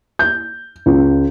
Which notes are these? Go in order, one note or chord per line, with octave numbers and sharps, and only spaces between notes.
G6
C#2